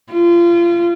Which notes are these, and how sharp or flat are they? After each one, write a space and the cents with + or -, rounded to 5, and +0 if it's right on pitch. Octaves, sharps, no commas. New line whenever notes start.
F4 -30